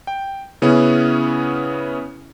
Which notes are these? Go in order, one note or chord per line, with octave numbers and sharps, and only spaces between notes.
G5
C#3 B3 C#4 E4 G#4